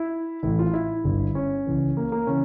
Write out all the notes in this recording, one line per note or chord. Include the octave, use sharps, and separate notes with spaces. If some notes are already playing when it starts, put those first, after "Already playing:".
Already playing: E4
A1 A2 E3 E4
F4
E4
G1 G2 D3
C#4
C#2 C#3 E3
A#3
A#3
C#3 E3 C#4